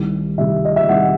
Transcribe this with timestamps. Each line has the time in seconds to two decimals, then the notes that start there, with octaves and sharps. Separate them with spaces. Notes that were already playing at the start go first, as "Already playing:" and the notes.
Already playing: C2 C3 D#3
0.38 C2 C3 D#3 E5
0.65 D#5
0.76 E5
0.89 C2 C3 D#3 F#5